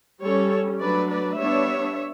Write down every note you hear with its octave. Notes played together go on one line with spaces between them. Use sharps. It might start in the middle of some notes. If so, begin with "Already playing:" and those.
G3 C#4 A4 C#5
F#3 A3 D4 B4 D5
B4 D5
G3 B3 D4 C#5 E5